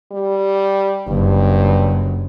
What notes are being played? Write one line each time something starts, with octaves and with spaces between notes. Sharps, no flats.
G3
F#1 G2